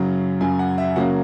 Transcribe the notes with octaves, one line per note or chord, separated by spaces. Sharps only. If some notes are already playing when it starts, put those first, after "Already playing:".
Already playing: F#2 C#3 F#3
F#2 C#3 F#3 G#5
F#5
E5
C#3 F#3 A#3 C#4 F#5